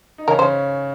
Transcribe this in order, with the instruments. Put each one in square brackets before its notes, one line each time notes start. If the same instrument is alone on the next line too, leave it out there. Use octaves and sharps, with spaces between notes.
[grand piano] D#4
[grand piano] C#3 C#4 [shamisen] A#4
[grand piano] C#3 C#4 [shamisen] C5